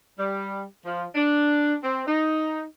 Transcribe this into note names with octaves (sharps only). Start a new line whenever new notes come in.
G3
F3
D4
C4
D#4